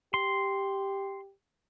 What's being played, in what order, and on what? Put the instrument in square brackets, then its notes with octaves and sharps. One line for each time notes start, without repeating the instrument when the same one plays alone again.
[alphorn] G4 [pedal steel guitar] C6